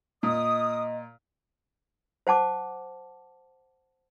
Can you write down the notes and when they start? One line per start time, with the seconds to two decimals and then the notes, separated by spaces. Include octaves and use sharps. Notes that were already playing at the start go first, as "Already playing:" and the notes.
0.23 A#2 D#5 D#6
2.27 C5 F#5 A5 D6